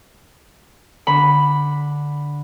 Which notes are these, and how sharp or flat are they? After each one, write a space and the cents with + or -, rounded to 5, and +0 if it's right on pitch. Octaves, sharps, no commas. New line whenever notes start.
D3 +0 B5 +0